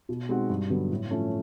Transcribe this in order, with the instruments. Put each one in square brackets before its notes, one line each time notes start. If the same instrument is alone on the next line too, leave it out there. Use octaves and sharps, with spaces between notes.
[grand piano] B2
G#3 C4 D#4 F#4
G2
D3 F#3 B3
A2
F3 A3 C#4